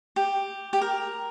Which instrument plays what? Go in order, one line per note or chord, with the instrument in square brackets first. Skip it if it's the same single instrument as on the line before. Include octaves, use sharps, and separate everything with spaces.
[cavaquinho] G4
G4
A#4